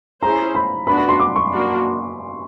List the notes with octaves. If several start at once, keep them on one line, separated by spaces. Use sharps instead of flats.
C#4 E4 G#4 C5 A#5
B5
B3 D4 F#4 B5
B5
C6
D6
C#6
A#3 D4 F#4